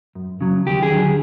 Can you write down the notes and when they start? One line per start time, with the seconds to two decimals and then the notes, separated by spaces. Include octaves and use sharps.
0.15 F#2
0.41 C#3 F#3
0.67 D#2 G4
0.83 G#4
0.91 D3 F#3